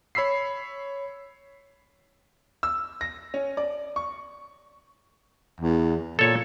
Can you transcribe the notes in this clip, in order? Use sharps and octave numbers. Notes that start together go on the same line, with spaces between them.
C#5 B5 E6 B6 C7
E6
A#6
C#4
D5
C#6
E2
A#2 A4 C#5